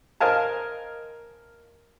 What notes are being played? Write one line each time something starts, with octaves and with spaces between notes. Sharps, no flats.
A#4 C5 D#5 F5 G#5 A5